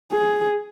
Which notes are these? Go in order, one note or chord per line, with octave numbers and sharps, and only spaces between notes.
G#4